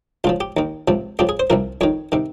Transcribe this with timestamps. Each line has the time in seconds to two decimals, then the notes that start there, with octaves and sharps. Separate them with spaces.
0.24 C#2 C#3 F3 F4
0.40 G4
0.57 D#2 D#3
0.88 C#2 C3 F3
1.19 F2 C#3 F3 G4
1.29 G#4
1.39 C5
1.50 C2 C3 F3 A#4
1.81 F2 D#3 C#5
2.12 C3 D#3